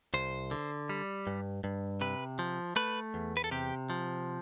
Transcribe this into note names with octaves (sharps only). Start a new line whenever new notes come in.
C2 C5
D3
G3
G2
G2
C3 B4
F3
A3 B4
E2
B4
A4
C3 G4
F3